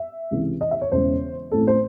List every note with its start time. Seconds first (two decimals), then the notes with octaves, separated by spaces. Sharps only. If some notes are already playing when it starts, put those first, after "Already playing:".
Already playing: E5
0.31 C#2 C3 E3
0.61 D#5
0.71 E5
0.81 C#5
0.92 E1 E2 C#3 G#3 C#4 C5
1.52 A1 A2 E3 A3 C4 A4
1.67 C5